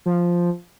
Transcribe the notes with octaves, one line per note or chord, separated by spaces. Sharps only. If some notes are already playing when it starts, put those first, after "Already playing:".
F3